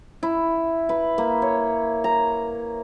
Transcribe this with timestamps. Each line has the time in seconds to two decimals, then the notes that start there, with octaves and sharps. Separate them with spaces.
0.23 E4
0.89 B4
1.18 A#3
1.42 C#5
2.04 A#5